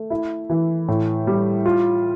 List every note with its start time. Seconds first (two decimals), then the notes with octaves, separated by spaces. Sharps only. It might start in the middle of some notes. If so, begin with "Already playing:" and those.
Already playing: A3
0.10 E4
0.50 E3
0.88 A2
1.27 G3
1.66 F4